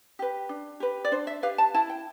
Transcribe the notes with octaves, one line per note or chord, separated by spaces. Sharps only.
G4 B4
D4
G4 B4
D5
D4 C5
E5
G4 B4 F5
A5
E4 A5
G5